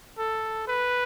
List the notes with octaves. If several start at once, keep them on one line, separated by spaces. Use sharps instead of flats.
A4
B4